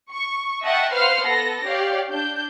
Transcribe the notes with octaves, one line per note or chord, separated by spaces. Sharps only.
C#6
D#5 E5 F#5 G5 A5 C#6
B4 C5 F5 F#5 C6 F6
B3 A4 A#6
G4 C#5 D5 F5
D4 G6